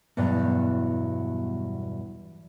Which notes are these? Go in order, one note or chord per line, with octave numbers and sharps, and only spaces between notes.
E2 G2 B2 F#3 G3